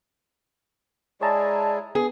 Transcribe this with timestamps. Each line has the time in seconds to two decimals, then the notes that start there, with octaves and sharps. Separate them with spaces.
1.21 G#3 E4 G#4 C#5 D5 A5 A#5
1.95 B3 G#4